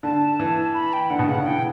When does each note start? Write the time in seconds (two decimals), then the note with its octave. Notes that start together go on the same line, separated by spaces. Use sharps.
0.03 D3 A5
0.40 E3
0.74 B5
0.93 G5
1.10 D3 F#5
1.19 B2
1.28 C#3 F#5
1.37 D3
1.46 E3 G5